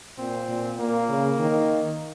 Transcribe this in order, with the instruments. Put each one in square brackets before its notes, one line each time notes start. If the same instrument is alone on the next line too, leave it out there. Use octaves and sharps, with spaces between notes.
[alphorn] A#2 [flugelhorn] C4
[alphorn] A#2
[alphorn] A#2 [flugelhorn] A#3
[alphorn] C#3
D#3